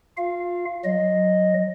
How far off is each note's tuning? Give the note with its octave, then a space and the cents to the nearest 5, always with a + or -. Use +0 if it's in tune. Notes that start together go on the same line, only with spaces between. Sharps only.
F4 +25 F5 -20
F#3 +0 D#5 +0